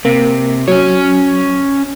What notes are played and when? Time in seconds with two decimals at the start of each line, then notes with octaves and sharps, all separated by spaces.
0.05 C3 A#3
0.68 F#3 C#4 C#5